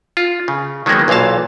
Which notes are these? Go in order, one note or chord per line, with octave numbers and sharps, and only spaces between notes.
F4
C#3
D#3 F#3 G#3 A#3 B3
B1 A#2 E3 F5 A5